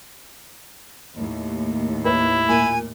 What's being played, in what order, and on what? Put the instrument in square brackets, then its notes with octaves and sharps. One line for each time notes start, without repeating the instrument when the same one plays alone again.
[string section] D#2 A2
[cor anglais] E4 [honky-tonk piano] B4 C#5
[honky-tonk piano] A#2 A#3 [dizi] G#5